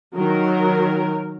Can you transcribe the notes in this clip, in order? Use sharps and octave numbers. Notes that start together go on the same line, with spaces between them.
D#3 F#3 A#4